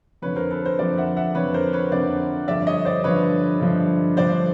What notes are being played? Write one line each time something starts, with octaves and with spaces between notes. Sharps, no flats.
F2 D3 F3 B4 C#5
A#4 C5
A4 B4
A#4 C5
F2 D3 F3 C5 D5
E5 F#5
E5 F#5
F2 D3 F3 B4 C#5
A#4 C5
B4 C#5
F2 D3 F3 C5 D5
G2 D3 F3 D5 E5
C#5 D#5
C5 D5
G2 D3 F3 B4 C#5
G2 D3 F3
G2 D3 F3 C5 D5